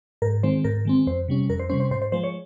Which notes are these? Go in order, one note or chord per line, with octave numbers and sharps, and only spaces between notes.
G#2 A#4
D#3 G#3 C4 C5
G#2 A#4
D#3 G#3 C4
F2 C5
C3 G3 C#4
F2 A#4
C5
C3 G3 C#4 C5
C5
G#2 C5
C5
F3 G#3 C5
C#5